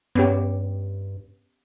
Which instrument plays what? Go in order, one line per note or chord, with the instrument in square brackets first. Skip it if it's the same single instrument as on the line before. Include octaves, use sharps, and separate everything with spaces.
[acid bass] G2 [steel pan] B3 C#4 G4